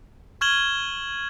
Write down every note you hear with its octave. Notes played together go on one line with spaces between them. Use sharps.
C#6 F6 G#6 E7 F#7 G7